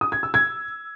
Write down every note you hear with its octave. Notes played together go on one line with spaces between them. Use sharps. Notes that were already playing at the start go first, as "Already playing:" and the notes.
D#6
G#6
E6
G#6